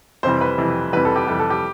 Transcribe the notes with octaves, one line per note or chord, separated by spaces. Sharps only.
F2 C3 E3 G3 C5
B4
F2 C3 E3 G3
F2 C3 E3 G3 B4
A4
G4
F2 C3 E3 G3 A4
A4
G4